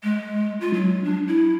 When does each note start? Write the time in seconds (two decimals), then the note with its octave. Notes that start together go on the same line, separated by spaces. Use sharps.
0.03 G#3
0.61 F4
0.74 F#3
1.04 D4
1.27 E4